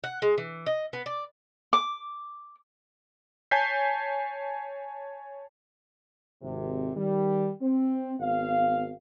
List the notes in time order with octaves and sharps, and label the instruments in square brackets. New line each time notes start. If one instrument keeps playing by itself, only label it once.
[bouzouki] F#5
G#3
E3
D#5
B3
D5
[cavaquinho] D6
[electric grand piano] C#5 G#5 A5 G6 B6 C7
[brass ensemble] G#1 C3
D#3 G3
C4
G#1 B3 F5